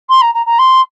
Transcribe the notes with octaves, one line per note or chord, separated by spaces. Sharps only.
C6
A#5
A#5
A#5
C6